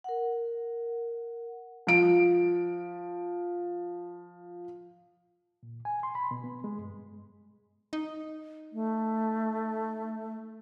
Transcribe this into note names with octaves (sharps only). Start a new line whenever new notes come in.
A#4 F#5
F3 D7
A#2
G#5
C6
B5
B2
B3
G#3
G2
D#4
A3